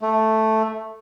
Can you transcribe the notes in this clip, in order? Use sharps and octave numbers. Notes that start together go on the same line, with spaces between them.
A3